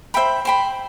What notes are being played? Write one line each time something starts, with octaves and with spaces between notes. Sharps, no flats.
C5 E5 G5 B5
C5 G5 B5